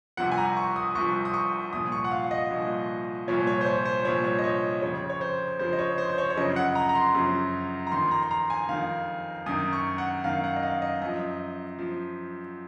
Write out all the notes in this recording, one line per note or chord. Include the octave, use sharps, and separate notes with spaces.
C2 C3 F3 F#5
G#5
A#5
C#6
D#6
C2 C3 F3 C#6
D#6
C#6
C2 A#2 F3 D#6
C#6
F#5
F5
D#5
C2 A#2 F3
C2 A#2 F3 C#5
C#5
C5
C#5
C5
C2 A#2 F3 C#5
C#5
D#5
C#5
F2 C#3 F3 C#5
C#5
C5
F2 C#3 F3 C5
D#5
C#5
C5
C5
C#5
C#5
F#2 C#3 F3 D#5
F#5
A#5
A#5
C6
F#2 C#3 F3
A#5
F2 D#3 C6
A#5
C6
A#5
G#5
F2 D#3 F5
F#2 D#3 D#6
C#6
F#5
F#2 D#3 F5
F#5
D#5
F5
D#5
F#2 F3 D#5
F3